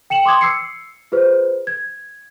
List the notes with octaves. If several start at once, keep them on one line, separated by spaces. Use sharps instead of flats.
G5 C#7 E7 F#7
C6 D6 D#6 G#6
E6 C7 C#7
F4 G#4 B4 C5
G#6